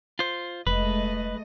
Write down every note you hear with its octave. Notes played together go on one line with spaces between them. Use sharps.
F4 C5
F1 G#3 A3 B4 D#5